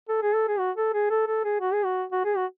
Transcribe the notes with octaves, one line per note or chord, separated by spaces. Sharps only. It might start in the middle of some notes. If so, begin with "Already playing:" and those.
A4
G#4
A4
G#4
F#4
A4
G#4
A4
A4
G#4
F#4
G#4
F#4
F#4
G#4
F#4